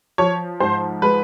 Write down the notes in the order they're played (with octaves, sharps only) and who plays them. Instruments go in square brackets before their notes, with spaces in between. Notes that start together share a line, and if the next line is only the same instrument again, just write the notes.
[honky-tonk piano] F3 C#5
G#2 C5
G#3 B4